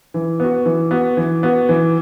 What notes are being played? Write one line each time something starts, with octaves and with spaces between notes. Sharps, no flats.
E3
B3 F#4
E3
B3 F#4
E3
B3 F#4
E3